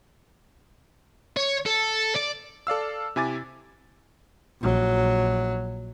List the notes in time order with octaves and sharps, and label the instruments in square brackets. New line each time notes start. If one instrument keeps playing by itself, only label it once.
[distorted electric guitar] C#5
A4
D5
[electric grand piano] A4 D5 F5 E6
C3 E4 G#5 D6 A6
[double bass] A#1 F#3